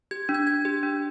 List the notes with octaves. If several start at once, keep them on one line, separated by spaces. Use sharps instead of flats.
G4 G#6
D4
G#6
D4 G#6
G4
D4